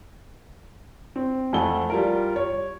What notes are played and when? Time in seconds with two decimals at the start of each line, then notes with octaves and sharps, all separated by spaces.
1.16 C4
1.53 F2 A3 A4 F#5 G#5 G7
1.90 G3 F4 A#4
2.36 C#5